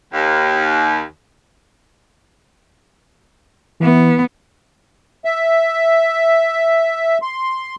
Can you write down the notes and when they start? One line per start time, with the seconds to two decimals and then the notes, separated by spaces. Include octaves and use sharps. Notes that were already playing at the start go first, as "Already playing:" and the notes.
0.12 D#2
3.80 E3 B3
5.25 E5
7.22 C6